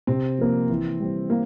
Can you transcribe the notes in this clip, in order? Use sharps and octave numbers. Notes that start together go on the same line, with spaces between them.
C3 C4
F3 A#3
E3
G3 C4
A#3